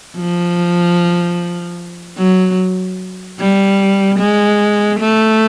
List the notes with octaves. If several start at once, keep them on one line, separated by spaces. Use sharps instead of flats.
F3
F#3
G3
G#3
A3